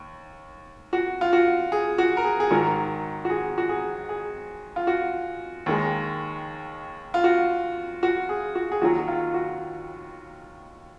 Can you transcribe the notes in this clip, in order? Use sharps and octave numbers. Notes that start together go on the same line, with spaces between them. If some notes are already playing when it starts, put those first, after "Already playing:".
Already playing: D#2
F#4
F4
F#4
G#4
F#4
A#4
G#4
G#4
G#2 D#3 F#3 A#4
F#4
G#4
F#4
G#4
G#4
F4
F#4
D#2 D#3 G#3
F4
F#4
F#4
G#4
F#4
G#4
D#2 D#3 F#3 F#4
F4
F#4